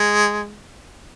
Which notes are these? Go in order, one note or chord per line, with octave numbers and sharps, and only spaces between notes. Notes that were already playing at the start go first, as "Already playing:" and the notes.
Already playing: G#3